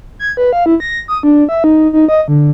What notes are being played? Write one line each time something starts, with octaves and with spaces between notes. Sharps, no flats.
G#6
B4
F5
E4
A#6
D#6
D4
E5
D#4
D#4
D#5
D3